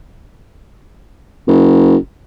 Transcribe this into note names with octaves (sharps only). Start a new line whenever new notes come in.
F#1